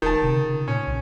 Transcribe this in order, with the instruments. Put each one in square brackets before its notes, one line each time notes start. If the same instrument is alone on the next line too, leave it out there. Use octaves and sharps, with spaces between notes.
[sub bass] D#1 [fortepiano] D#3 A5
[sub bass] C3
C#3
[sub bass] A#2 [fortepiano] C#4
[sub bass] C2